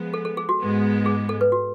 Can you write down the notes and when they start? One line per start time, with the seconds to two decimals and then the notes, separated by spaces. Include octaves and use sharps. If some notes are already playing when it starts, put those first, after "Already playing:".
Already playing: F3 G#3 B3
0.14 A4
0.25 A4
0.37 G#4
0.49 F#4
0.60 G#2 G#3 B3
1.06 G#4
1.29 A4
1.41 B4
1.52 F#4